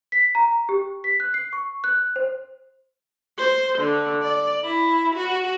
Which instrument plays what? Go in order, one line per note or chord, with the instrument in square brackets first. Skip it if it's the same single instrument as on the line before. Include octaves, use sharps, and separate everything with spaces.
[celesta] B6
A#5
G4
B6
F#6
C7
C#6
F#6
C5
[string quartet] C5
D3
D5
E4
F#4